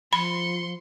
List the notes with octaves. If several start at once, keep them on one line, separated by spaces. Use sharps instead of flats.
F3 B5 C6 C#7